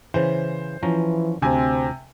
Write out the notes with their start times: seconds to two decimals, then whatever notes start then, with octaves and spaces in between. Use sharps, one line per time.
0.14 C#3 E3 C5
0.83 E3 F3 C#4 A#5
1.42 D2 C3 C4 G#5